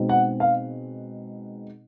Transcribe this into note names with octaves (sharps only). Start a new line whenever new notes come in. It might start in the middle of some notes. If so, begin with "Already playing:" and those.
Already playing: B2 G#3 C4 D#4
F#5
F5